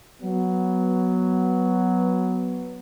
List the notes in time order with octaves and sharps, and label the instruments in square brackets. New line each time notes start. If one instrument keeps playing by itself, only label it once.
[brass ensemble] F#3 B3